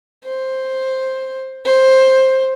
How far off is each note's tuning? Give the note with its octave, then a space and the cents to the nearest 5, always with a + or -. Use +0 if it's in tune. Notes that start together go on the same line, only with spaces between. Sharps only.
C5 +5
C5 +10